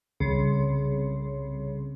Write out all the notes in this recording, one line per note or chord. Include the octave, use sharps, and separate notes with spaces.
C2 C#3